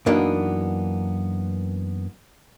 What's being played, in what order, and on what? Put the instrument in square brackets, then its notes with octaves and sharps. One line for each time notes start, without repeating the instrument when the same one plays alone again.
[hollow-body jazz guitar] F#2 E3 A#3 B3 D4 D#4